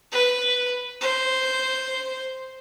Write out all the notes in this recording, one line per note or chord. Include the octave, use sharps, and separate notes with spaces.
B4
C5